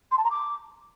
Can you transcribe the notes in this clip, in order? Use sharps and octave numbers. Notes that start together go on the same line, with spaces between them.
C6
A5
A#5
D6